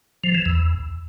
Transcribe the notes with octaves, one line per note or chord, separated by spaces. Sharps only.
F3
E3
E2